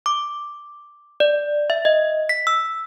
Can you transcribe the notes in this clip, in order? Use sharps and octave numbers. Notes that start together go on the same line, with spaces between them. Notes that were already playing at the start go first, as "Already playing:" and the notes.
D6
D5
E5
D#5
B6
E6